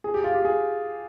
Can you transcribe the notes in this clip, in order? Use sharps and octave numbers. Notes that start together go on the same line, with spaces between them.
G#4
G4
F4
G4
G#4